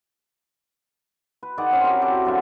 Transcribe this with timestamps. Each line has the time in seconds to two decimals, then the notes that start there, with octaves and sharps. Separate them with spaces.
1.43 B4
1.58 D#3 G#4 D5 F#5
1.71 C4 C#4 G#4
1.84 E4 F#4 G4 A#4
2.01 F#4 G4 A4 D5
2.25 F#2 D3 E5 F5